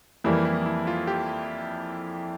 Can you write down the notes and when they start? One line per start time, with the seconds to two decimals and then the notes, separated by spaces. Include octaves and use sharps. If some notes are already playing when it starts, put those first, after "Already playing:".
0.24 F2 E3 G3 A#3 E4
0.45 E4
0.66 E4
0.87 F4
1.07 G4